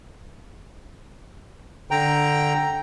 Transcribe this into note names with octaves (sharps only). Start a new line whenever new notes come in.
D3 G5 A#5